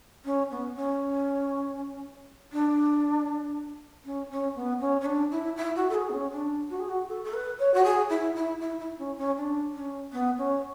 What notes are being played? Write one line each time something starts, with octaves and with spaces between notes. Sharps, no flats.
C#4
B3
C#4
D4
C#4
C#4
B3
C#4
C#4
D4
E4
E4
F#4
A4
G#4
B3
C#4
D4
F#4
G#4
F#4
A4
A4
B4
C#5
F#4
G#4
E4
E4
E4
E4
C#4
C#4
D4
C#4
B3
C#4